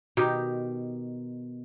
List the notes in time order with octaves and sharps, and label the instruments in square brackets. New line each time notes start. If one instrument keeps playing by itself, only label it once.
[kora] B2 D#3 D#4 G4